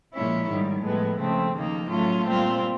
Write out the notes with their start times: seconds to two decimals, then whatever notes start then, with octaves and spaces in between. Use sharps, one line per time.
0.14 A#2 F3 G#3 C#4 E4
0.49 G#2 D#3 G3
0.84 A2 F3 G#3 B3
1.19 C#3 F3 A3 C4
1.54 D#2 C#3 F3 A#3 D#4
1.89 A2 F#3 A3 C#4 F4
2.26 A#2 G3 C4 F4